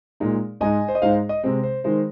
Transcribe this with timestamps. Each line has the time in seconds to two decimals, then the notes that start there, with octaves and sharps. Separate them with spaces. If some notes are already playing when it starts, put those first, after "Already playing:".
0.20 A#2 G#3 D#4
0.61 G#2 G#3 D#4 D#5 G#5
0.88 C5
0.95 D#5
1.02 G#2 G#3 D#4 C5 F5
1.29 D#5
1.43 C3 G#3 C4
1.63 C5
1.84 D#3 G#3 C5